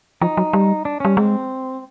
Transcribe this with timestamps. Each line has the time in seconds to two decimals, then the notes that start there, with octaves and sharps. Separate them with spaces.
0.22 F3 D#4
0.37 F#3
0.53 G3
0.85 D4
1.00 G3 C#4
1.17 G#3 C4